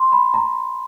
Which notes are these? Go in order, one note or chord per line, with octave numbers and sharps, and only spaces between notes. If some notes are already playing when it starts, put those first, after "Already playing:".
Already playing: C6
B5
A#5